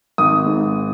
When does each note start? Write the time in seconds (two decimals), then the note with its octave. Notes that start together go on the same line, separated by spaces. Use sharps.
0.18 G#1 D#6
0.46 G#2